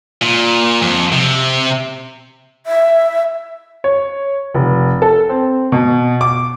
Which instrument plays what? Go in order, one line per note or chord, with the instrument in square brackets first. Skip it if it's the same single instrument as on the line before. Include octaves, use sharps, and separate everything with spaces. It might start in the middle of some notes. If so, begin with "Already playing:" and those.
[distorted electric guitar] A#2
F2
C3
[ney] E5
[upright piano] C#5
F1
A4
C4
B2
D6